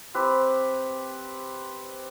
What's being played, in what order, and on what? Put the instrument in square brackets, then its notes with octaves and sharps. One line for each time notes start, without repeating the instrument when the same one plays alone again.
[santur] C4 G4 B4